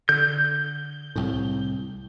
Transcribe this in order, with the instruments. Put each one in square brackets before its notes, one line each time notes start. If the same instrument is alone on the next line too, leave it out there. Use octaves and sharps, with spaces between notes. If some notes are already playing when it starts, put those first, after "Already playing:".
[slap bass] D3 [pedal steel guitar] G6
[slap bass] C2 A2